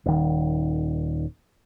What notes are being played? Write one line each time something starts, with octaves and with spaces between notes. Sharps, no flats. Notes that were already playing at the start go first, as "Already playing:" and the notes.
D#1 D#3